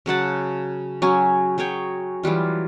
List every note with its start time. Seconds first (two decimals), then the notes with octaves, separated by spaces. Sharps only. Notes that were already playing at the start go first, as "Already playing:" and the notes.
0.06 C#3 F#3 F#5 A5
1.02 F#3 C#4 G#5
1.58 F#3 G#4 C#5 G5
2.23 E3 F#3 G3 F4